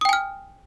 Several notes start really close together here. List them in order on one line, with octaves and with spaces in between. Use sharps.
D#6 G5 G#5 F6